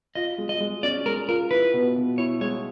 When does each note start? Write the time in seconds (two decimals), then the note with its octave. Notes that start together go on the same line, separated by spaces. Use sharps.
0.15 F4 D#5
0.38 G#3
0.49 D#5
0.61 G#3
0.83 C#4 D5
1.06 G#3 A#4
1.28 F4 A#4
1.51 E4 B4
1.73 B2
1.96 B2
2.18 E4 C#5
2.41 G#3 C#5